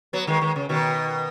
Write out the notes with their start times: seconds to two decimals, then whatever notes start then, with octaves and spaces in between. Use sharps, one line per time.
0.13 F#3 B3
0.27 D#3 G#3
0.41 D#3 G#3
0.56 C#3
0.69 B2 D#3